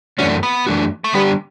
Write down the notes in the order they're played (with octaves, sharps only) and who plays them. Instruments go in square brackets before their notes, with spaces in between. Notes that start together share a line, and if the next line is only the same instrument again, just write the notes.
[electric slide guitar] F#2 E3 A3 D4 F#4 [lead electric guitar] C#4
[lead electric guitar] B3
[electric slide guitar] F#2 E3 A3 D4 F#4
[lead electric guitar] A3
[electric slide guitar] D3 G3 D4 G4 [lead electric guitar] B3